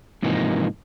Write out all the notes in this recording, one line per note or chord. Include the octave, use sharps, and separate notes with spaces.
G#2 C3 E3 F3 A#3 D#4